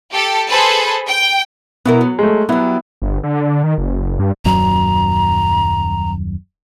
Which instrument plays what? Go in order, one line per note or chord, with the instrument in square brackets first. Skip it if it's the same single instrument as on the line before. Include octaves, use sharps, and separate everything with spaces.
[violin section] G4 A4
G#4 A4 B4 C5 A5 B5
G5
[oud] B2 E4 A#4 [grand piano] B3
[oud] F#3
[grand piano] G#3 A3
[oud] F#3 G3 [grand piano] B3 E4
[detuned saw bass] G1
D3
D#3
F#1
G2
[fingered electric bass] D#1 F#2 F#3 [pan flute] A#5